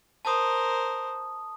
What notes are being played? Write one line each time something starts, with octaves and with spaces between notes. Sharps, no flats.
A#4 C5 A5 D#6